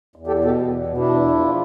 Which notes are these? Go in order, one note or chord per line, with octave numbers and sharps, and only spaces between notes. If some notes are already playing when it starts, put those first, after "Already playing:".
E2
G4 A4
B2
G4 A4
E2
B2
D4 E4
E2
F3